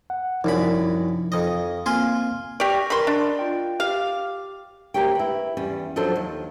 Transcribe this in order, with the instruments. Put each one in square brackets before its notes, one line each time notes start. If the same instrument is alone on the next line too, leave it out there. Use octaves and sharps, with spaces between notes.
[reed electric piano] F#5
[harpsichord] C2 F#2 B5 [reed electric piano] F3 D#4
[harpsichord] F2 D#5
[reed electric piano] A#3 C4 [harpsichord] F4 G#5 C6
[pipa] G4 D5 [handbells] C#6 F6 A#6
[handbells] A#4 D5 [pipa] B5 C6
[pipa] D4 [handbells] D5 D#5
[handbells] F4 G5
[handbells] G4 [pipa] F5
[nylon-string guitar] D2 C#3 A#3 G4 C#5 G5
E4 B4
E2 G3 C#4
F3 F#3 D4 A4 C5
D#2